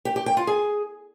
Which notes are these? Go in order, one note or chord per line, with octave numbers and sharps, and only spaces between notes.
G4
G4
G5
F4
G#4